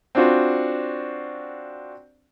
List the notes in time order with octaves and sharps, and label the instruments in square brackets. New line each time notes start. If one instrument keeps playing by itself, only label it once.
[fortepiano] C4 D4 F4 F#4 C5